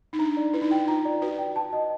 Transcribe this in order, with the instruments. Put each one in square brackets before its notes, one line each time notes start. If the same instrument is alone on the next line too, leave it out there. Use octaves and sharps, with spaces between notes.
[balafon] D#4
[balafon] D4 [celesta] A#5
[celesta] D5
[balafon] E4 [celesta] B4
[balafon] D#4
[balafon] E4 [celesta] G5
[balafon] F4 [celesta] A#5
[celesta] D5
[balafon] F#4 [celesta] B4
[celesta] G5
A5
D#5